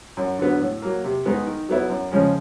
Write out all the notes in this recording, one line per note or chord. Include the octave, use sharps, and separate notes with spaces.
F#2
D3 F#3 B3
A2
F#3 A#3
C3
D#3 G#3 B3 D#4
D#3
F#3 B3 E4
F#2
C#3 F3 G#3 C#4